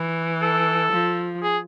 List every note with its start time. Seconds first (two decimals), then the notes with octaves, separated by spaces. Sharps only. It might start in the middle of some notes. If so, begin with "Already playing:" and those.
Already playing: E3
0.42 A4
0.92 F3
1.43 G#4